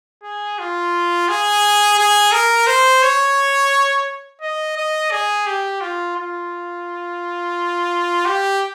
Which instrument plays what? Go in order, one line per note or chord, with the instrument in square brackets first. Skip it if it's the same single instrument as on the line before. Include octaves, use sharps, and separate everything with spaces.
[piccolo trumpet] G#4
F4
G#4
G#4
A#4
C5
C#5
D#5
D#5
G#4
G4
F4
F4
G4